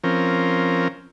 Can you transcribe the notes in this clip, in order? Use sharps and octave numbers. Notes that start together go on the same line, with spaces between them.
F3 C4 C#4 A#4